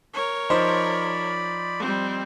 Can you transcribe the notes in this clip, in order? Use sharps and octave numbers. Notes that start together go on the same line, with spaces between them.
A#4 C#5
F3 D#4 C5 D5 B5
G3 C4